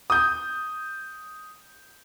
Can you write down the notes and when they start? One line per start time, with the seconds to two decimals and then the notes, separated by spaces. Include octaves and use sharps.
0.10 D#6 G6